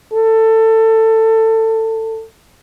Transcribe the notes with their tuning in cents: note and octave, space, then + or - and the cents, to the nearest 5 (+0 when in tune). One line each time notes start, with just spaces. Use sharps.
A4 +20